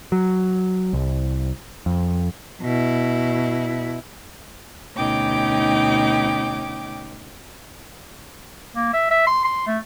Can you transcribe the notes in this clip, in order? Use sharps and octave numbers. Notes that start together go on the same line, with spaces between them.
F#3
C2
F2
B2 E4
D2 B2 C#4 D#4 G5 D6
A#3
E5
E5
C6
C6
A3